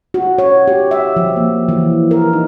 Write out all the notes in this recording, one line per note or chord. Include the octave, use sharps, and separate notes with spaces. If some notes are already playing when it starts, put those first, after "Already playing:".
F#4
C#5
G4
E5
F3
A#3
E3
A#4
D#4